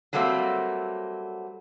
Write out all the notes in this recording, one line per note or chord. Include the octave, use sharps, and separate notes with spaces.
F#3 G3 A3 A#3 C4